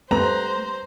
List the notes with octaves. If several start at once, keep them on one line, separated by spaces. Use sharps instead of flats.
G3 A3 C4 B4 C5 A#5